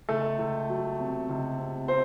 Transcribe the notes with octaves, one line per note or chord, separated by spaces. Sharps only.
C#2 A3 A4
C#2
F#3
C3
C#2
C3
C4 C5